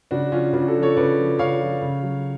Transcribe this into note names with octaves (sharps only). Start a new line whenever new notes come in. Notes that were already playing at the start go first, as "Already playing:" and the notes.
C#3 D4 F#4
F3 C#4 F4
C#3 D4 F#4
F#4 A4
F3
A4 C#5
C#3 B4 D5
F3
C#3 C#5 F5
F3
C#3
F#3